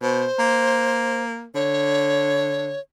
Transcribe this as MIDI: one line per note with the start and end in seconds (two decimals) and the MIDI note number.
0.02 0.25 47
0.02 1.23 72
0.39 1.46 58
1.55 2.75 50
1.55 2.80 73